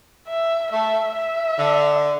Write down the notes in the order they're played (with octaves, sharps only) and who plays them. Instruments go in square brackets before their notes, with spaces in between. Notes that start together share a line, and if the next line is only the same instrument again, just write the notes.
[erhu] E5
[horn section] A3 [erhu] E5
[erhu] E5
[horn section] D3